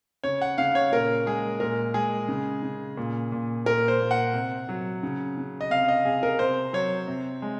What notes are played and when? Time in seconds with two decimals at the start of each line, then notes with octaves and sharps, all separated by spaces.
0.24 C#3 C#5
0.42 F#5
0.58 C#3 F5
0.75 C#5
0.92 A#2 A#4
1.26 G#3 G#4
1.60 A#2 A#4
1.94 G#3 G#4
2.28 C#3
2.63 C#3
2.97 A#2
3.32 A#2
3.66 A#2 A#4
3.88 C5
4.00 A#2
4.11 F#5
4.34 C3
4.69 F#3
5.03 C#3
5.37 C#3
5.61 D#5
5.70 C3 F5
5.88 D#5
6.05 C3 G#4
6.23 A#4
6.39 C3 C5
6.73 F#3 C#5
7.08 C3
7.42 G#3